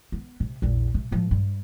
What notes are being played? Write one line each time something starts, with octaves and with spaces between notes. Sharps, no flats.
B3
C3
A#1 E2
C3
A2 F3
G2